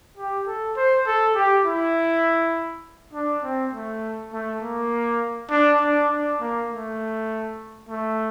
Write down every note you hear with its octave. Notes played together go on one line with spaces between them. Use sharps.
G4
A4
C5
A4
G4
E4
D4
C4
A3
A3
A#3
D4
D4
D4
A#3
A3
A3